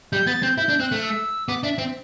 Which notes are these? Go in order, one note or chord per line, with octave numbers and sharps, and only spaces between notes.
G3 G6
B3 A6
C4 G6
E4 G6
D4
C4 F#6
A3
E6
B3 D6
D4 E5
C4